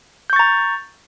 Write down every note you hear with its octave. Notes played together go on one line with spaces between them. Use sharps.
A#5 C#6 G6 A6